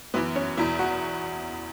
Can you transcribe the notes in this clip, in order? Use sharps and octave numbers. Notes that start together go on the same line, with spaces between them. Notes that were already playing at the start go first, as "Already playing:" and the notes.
F#2 E3 B3
C#4
E2 B2 E4
F#4